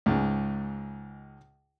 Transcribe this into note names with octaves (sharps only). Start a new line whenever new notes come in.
C#2 G#2